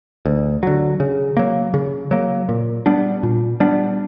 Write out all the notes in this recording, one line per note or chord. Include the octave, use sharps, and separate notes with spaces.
D2
D3 F#3
C#3
F#3 A#3
C#3
F#3 A#3
A#2
G3 B3 D4
A#2
G3 B3 D4